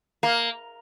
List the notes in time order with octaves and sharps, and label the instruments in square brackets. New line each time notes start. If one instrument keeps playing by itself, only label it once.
[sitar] A#3